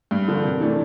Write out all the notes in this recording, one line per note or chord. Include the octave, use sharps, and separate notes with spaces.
G2
D3 F3 A#3
C3
E3 A3 D4